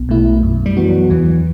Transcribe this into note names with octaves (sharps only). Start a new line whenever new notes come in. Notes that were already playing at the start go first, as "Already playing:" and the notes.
Already playing: B1 B3
B2 A3 E4
F#2
G3
E3 B3 F#4
F#3
E2 E3